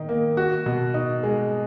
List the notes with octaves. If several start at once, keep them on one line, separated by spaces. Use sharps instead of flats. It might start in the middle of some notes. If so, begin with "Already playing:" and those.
Already playing: D#3 D#4
A#3
F#4
B2
D#4
G#3